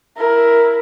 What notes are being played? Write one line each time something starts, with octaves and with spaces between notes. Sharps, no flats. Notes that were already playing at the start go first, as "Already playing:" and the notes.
E4 A#4